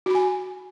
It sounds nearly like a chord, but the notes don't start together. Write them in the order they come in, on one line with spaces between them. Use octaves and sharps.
F#4 B5 G#5